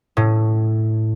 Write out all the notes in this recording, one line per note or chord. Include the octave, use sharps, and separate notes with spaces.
A2